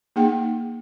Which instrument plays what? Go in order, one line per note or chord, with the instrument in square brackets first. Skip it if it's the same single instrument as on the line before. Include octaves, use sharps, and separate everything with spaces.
[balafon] A#3 D#4 G#4 F#5 G5